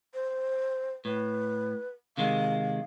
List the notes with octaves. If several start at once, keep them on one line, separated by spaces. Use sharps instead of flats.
C5
A2 B4
C3 D#3 G#3 F5